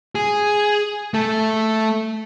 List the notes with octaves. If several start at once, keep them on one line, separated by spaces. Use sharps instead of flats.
G#4
A3 A4